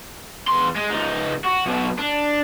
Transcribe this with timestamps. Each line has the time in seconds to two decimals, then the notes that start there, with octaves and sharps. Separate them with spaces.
0.48 E2 C6
0.76 G#3
0.90 C#2 D#4
1.44 F#4
1.65 B1 B2
1.99 D4